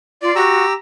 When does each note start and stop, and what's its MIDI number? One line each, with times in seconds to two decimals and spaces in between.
0.22 0.34 65
0.22 0.34 74
0.36 0.64 66
0.36 0.73 67
0.36 0.73 82
0.36 0.73 88